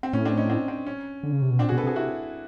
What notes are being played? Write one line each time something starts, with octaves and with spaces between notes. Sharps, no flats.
C4
A2 C#4
C4 D4
C#4 D#4
C4 D4
C4
C#4
D3
C#3
C3
B2
A#2 C4 D4
F#4 G#4
B2
A4 B4
C3 F#4 G#4
E4 F#4